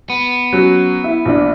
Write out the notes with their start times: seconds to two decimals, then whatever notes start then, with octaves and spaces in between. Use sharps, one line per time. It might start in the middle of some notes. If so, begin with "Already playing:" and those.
0.10 B3
0.53 F#3 C#4
1.04 E4
1.25 A#1 D4